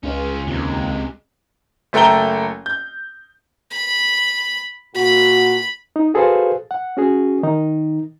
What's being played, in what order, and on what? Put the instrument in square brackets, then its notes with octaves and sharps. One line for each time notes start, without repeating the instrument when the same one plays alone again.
[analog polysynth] C#2 [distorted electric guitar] C#4 F4
[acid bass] D#2 [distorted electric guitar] C3 G#3
[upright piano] F#1 A3 A4 G5 A#5 G7
G6
[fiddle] B5
[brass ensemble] A#2 F#4 [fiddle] B5
[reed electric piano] D#4
F#4 G#4 A4 B4 C5 F5
F#5
C#4 F#4 G#4
D#3 D#4